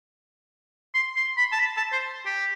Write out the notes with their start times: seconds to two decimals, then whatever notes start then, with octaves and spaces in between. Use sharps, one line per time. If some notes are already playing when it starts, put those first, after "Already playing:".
0.94 C6
1.16 C6
1.37 B5
1.52 A5
1.59 B5
1.77 A5
1.93 C5
2.26 G4